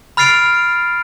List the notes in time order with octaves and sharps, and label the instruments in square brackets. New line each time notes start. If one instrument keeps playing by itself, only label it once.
[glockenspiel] B5 F6 A6 C7 D7 F7